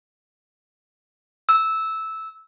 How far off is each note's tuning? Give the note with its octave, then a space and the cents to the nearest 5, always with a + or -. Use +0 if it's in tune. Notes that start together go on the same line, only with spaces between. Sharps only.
E6 -10